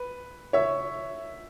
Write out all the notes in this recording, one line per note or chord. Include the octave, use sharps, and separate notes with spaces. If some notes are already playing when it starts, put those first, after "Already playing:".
Already playing: B4
C#5 E5